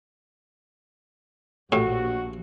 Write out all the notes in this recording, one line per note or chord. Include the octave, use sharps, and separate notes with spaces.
A#1 A2 F#4 G4